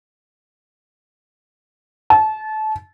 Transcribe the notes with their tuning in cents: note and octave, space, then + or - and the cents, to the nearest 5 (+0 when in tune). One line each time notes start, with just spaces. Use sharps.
A5 -25